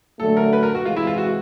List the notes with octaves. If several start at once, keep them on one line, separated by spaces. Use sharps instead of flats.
D3 F#3 A3 A4
A#4
B4
A#4
F#4
C3 E3 G#3 F4
E4
F4
F#4